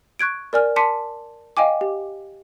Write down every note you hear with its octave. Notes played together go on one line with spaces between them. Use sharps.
C#6 F#6 G#6 D7
A#4 D5 G#5 F6
A5 C6 D6 B6 C#7 D#7
D#5 F5 G5 G#5 D6
G4